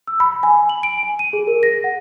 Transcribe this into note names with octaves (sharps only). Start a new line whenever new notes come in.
E6
B5
G#5
F#7
D7
G#5
D#7
G#4
A#4
A#6
F#5